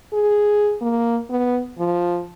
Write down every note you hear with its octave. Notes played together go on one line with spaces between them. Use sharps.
G#4
A#3
B3
F3